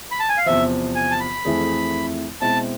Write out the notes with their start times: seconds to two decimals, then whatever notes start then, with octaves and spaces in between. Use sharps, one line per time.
0.11 B5
0.20 A5
0.29 G#5
0.38 F5
0.46 E2 C3 F3 E5
0.95 G#5
1.11 A5
1.20 B5
1.45 F2 E3 A3 E4 G#4
2.41 B2 G#3 C4 E4 A5